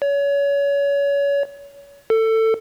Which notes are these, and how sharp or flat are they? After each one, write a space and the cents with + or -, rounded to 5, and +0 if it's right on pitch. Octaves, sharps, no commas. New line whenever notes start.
C#5 +30
A4 +20